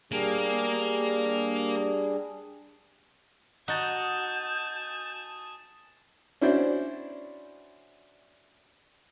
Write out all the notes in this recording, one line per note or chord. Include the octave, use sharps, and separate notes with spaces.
G3 A#3 D4 G#4
D#4 F#4 G#5 A5 D#6 G6 A6
C#4 D4 E4 F#4 C5 D5